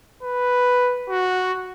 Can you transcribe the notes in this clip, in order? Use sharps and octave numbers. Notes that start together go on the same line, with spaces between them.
B4
F#4